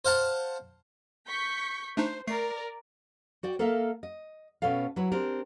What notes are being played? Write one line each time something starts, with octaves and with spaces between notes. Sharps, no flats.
C5 F5 F#5 A5
C#6 G6 B6
A3 D4 D#4 C5
A3 A#4 D5 C7
F#4 D5 G5
A#3 A4 A#4 E5 F5
D#5
B2 B3 C#4 A4 F5
F#3 E4 B4 C#5
C4 D4 G4 A#4